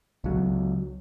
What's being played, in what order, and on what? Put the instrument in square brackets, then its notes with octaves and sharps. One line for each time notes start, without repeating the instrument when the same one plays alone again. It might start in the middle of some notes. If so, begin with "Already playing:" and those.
[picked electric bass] C#2 F#3